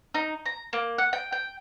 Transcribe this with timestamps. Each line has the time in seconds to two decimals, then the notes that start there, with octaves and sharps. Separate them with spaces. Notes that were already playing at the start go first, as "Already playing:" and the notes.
0.14 D#4
0.46 A#5
0.73 A#3
0.98 F#5
1.13 G5
1.32 G5